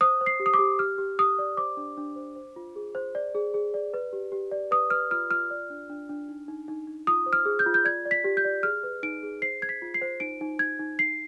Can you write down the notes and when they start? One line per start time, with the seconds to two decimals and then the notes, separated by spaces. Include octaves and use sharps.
0.01 C5 D#6
0.21 C5
0.26 C7
0.40 G4
0.46 D#6
0.54 D6
0.59 G4
0.79 G4 F6
0.98 G4
1.19 G4 D#6
1.39 D5
1.57 C5 D6
1.77 D4
1.97 D4
2.16 C5
2.36 C5
2.56 F4
2.76 G#4
2.95 C5
3.15 D5
3.35 G#4
3.54 G#4
3.74 D5
3.94 B4
4.13 G4
4.32 G4
4.51 D5
4.71 B4 D#6
4.90 B4 F6
5.11 F4 F6
5.30 F4 F6
5.51 D5
5.70 D4
5.90 D4
6.09 D4
6.28 D#4
6.48 D#4
6.68 D#4
6.87 D#4
7.07 F4 D#6
7.26 C5
7.33 F6
7.45 G#4
7.59 G6
7.66 F4
7.74 G6
7.85 D5 G#6
8.05 D5
8.11 B6
8.24 G4
8.37 G6
8.45 D5
8.63 G#4 F6
8.83 B4
9.03 D#4 D7
9.23 G#4
9.42 C5 C7
9.62 C5 G#6
9.69 B6
9.82 F4
9.94 C7
10.02 C5
10.20 D#4 D7
10.41 D#4
10.59 D#4 G#6
10.79 D#4
10.99 D#4 C7